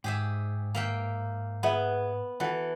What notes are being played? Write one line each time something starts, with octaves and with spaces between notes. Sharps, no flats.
G#2 G4 G#4 E5
A#3 E5 G5
B3 G#4 E5 F#5
E3 F#4 A4 F#5